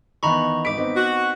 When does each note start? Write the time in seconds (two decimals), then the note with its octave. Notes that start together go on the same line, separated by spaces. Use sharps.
0.23 D#3 E3 B3 A#5 B5 C#6
0.65 G#1 D#4 D6 B6 D7
0.78 B3 C4 D#4
0.95 F#4